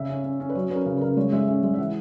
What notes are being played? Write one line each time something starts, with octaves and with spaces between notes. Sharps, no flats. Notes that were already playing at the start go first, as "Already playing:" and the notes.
Already playing: C#3 E5
C#4
C#4
C#4
B4
F#3 C#5
C#4 B4
A#4
C#3 G#4
B4
C#3 A#4
G#3 C#5
G#3 E5
C#4 E5
G#3 E5
E5
E3 F#5